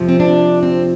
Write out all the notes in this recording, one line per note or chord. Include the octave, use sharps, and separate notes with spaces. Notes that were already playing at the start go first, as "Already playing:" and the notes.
Already playing: F2 C3 F3
C4
D4
C4